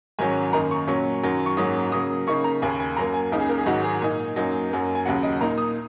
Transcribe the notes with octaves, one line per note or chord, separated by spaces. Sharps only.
G#2 D#3 F#3 C#4 G#5
F#2 D#3 A#3 D#4 A#5
C#6
A#2 F#3 C#4 C#6
F#2 D#3 F#3
C#6
G#2 F#3 A#3 C#4 D#6
C#3 F#3 A#3 D#6
C#3 A#3 D#4 C#6
A#5
D#2 C#3 A#3 G#5
G#5
F#2 F#3 A#3 A#5
G#5
C#2 C#3 A#3 D#4 A#4
G#4
A#4
G#4
G#2 D#3 F#3 D#4 F#4
G#4
A#2 A#3 D#4 G#5
F#2 F#3 A#3 D#4
F#2 F#3 A#3
G#5
D#2 C#3 F#3 F#5
D#5
A#2 A#3 D#4 A#5
D#6